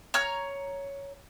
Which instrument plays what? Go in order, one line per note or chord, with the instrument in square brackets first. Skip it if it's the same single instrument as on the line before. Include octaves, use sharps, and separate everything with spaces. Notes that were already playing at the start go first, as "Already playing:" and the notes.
[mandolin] C#5 A#5 F6